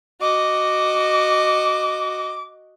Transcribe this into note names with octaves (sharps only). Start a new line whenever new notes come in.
F#4 D#5 D6